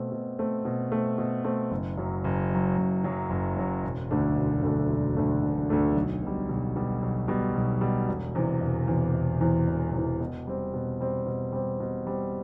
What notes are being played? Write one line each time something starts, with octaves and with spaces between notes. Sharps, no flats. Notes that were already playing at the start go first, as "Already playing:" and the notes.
Already playing: B2 A3 C4
B2
A3 C4
B2
A3 C4
B2
A3 C4
F#1
F#2 F#3
F#1
F#2 F#3
F#1
F#2 F#3
F#1
F#2 F#3
E1
D2 D3 A3 D4
E1
D2 D3 A3 D4
E1
D2 D3 A3 D4
E1
D2 D3 A3 D4
B1
B2 G3
B1
B2 G3
B1
B2 G3
B1
B2 G3
E1
E2 C3 E3
E1
E2 C3 E3
E1
E2 C3 E3
E1
E2 C3 E3
B2
G3 C4
B2
G3 C4
B2
G3 C4
B2
G3 C4